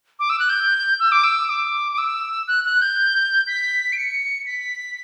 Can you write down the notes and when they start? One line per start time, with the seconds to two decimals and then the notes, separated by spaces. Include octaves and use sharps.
0.20 D6
0.30 E6
0.39 F#6
0.49 G6
1.00 E6
1.12 D6
1.24 E6
1.49 D6
1.92 D6
1.98 E6
2.48 F#6
2.65 F#6
2.82 G6
3.47 B6
3.92 D7
3.97 C#7
4.46 B6